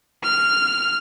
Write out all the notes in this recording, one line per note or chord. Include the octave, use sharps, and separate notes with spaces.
F6